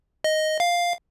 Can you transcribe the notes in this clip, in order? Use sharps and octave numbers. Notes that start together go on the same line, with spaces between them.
D#5
F5